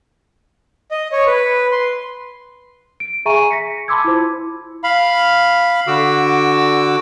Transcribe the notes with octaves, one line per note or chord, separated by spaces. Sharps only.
D#5
C#5
B4
C6
D7
G#4 E5 G#5 A#5 C#6 D#7
A#6 B6 C#7
A5 B5 C6 D6 E6 G#6
E4 F4 C5
F5 B5
D3 F#4 D6 E6